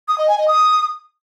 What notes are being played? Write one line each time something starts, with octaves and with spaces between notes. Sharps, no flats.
D#6
D#5
G#5
D#5
D#6